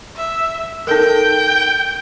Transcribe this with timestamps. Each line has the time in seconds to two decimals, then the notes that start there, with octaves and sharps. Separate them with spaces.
0.16 E5
0.87 D#4 A4 A#4 G5